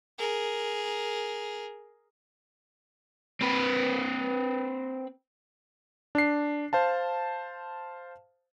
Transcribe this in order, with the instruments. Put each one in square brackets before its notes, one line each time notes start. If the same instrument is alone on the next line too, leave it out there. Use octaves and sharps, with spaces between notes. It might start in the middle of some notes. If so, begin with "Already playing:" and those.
[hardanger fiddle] G#4 A#4
[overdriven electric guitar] C4 B4
[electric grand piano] D4 C7
C5 F5 A5